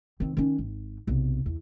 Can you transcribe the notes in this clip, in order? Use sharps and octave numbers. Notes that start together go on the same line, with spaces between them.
D#3 C4
D#3 C#4
G#1
B1 C3
E2